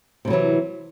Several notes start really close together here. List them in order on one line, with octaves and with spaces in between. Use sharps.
C3 A2 F#3 E3